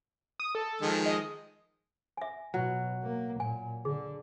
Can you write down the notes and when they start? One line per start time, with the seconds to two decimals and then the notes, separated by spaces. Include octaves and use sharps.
0.40 D#6
0.55 A4
0.81 D#3 F3 G#3
1.06 D#5
2.17 E5 G#5
2.54 B2 F#3
3.03 A#3
3.40 A#2 G#5
3.85 D3 G#4